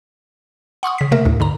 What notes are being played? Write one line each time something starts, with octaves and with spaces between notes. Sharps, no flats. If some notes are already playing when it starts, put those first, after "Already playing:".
F#5 C6 C#6 D#6
C#3 B6
C3 A3 A#3 A#4 E5
D2 A2
G#2 D3 A#5